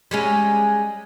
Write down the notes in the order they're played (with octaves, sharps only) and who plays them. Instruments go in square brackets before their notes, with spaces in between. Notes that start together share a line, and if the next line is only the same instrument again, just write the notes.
[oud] G3 G#3 C#4